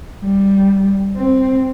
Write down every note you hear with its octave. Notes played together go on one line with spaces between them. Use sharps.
G3
C4